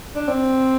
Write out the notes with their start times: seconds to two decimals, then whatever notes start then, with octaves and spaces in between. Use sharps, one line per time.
0.15 D4
0.28 C4